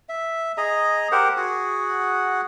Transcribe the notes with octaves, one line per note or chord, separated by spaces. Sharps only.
E5
G#4 D#5 A#5
G4 A#4 C5 F#5
F#4 G#4 F#5